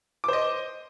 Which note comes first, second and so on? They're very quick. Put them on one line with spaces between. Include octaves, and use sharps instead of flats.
D6 C5 D#5